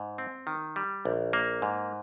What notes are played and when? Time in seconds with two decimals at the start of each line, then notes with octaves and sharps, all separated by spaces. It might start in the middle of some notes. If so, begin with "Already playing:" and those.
Already playing: G#2
0.18 C4
0.47 D#3
0.76 G3
1.05 A#1
1.33 A#3
1.62 G#2